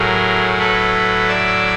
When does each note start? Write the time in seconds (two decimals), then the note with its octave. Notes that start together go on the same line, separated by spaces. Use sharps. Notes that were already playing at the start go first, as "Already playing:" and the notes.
Already playing: A2 F#3 G#4 A#4
0.59 A4 B4
1.28 D5 E5